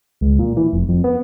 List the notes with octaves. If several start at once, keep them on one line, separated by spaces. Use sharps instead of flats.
C#2
A#2
E3
F1
F2
B3